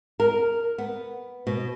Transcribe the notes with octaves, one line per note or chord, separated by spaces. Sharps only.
A#4
B3
B2